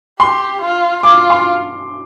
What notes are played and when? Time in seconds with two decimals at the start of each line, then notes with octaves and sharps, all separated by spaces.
0.20 G4 C6
0.62 F4
1.03 F4 D6
1.30 C6